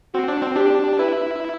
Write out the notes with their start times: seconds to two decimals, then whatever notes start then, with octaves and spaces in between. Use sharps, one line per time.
0.14 C4 F#4
0.28 D4
0.42 C4
0.56 D4 G4
0.99 E4 B4